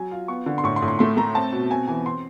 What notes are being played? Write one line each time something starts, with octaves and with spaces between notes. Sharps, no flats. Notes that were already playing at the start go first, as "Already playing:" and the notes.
Already playing: F#3 G#5
F4
B3 C#6
D3
C6
A2 C#6
C6
A2
C6
A3 C6
A3 A#5
C4 A5
B2
C4 G#5
E3 G#5
C4 C6